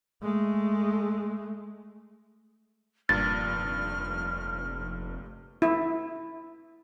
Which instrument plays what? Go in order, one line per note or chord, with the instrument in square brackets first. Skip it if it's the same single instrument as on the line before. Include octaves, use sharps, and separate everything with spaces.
[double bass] G#3 A3
[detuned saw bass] F1 [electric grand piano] G2 A#2 [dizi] F6 [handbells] A6
[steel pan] E4